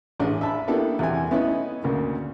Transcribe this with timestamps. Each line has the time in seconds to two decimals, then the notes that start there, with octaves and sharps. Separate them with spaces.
0.19 A1 C#4 D4 G#4
0.41 E5 A5 B5
0.68 A#3 B3 D4 E4 G4 A4
0.99 E2 C3 G#5
1.31 A3 B3 C#4 D#4 E4
1.84 D2 C#3 A#3